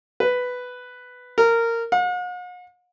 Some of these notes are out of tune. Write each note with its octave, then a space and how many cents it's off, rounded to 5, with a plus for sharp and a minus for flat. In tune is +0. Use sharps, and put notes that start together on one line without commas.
B4 +5
A#4 -15
F#5 -45